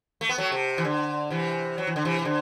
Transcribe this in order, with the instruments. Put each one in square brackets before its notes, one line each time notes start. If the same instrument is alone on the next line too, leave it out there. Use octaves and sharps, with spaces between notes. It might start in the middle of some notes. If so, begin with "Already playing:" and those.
[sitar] A3
B3
F#3 A3
C3
E3
D3
C3 E3
F#3
E3
D3
C3 E3
C3
D3